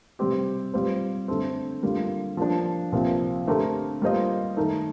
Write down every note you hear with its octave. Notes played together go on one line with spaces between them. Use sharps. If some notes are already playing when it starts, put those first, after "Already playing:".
C3 G3 C4 G4
G3 C4 F4 C5
D3 A3 C4
D3 G3 A#3 F4
F3 A#3 D4
C2 A#2 F3 C4
D3 A3 C4 G4 A#4
G3 A#3 F4 C5 D#5
D#3 A3 D#4 A#4